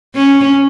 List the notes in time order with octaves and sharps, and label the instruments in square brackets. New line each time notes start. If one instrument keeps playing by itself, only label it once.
[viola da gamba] C#4